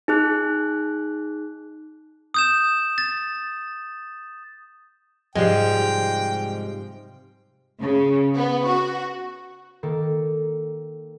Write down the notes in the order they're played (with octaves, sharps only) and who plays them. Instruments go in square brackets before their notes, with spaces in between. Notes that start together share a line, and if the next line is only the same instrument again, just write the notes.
[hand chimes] D#4 G#4 F#6
[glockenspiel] D#6 G6 E7
A6
[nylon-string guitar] G#2 F3 [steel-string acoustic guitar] C3 G3 [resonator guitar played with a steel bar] G#3 [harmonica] G5
[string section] C#3
B3
F#4
[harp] D#3 A#3 A4